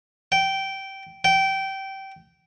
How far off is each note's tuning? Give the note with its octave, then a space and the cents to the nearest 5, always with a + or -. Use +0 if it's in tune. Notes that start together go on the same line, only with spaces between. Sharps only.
G5 -15
G5 -20